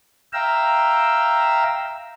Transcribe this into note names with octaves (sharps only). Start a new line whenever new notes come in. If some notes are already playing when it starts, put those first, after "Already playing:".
E5 F5 G5 A#5 E6